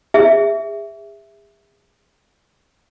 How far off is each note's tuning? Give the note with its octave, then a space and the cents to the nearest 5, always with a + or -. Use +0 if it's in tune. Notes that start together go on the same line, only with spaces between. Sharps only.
G#4 -40 E5 +0